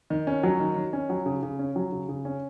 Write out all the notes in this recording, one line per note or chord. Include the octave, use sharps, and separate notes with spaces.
D#3
C#4
F#3
D#3
D#3
C#4
F#3
C#3
C#3
C#4
F#3
C#3
C#3
C#4